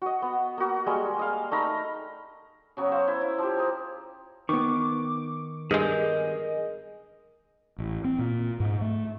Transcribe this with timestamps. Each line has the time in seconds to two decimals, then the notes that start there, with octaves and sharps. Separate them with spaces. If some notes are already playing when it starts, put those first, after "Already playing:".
0.02 F#4 D#5
0.22 B3
0.58 A#3 F#4
0.86 G3 G#3 A#3
1.19 D#5 F5
1.51 A3 D#4 A#5 B5
2.77 C#3 F#3 B3
2.92 C5 F5
3.08 E4
3.21 E4
3.38 F3 G4
3.57 G#4 A#5
4.49 D#3 B3 C#6 D6
5.71 G2 G#3 G#4 A#4 D#5 G6
7.78 A1
8.04 C4
8.19 A#2
8.60 G#2
8.81 A3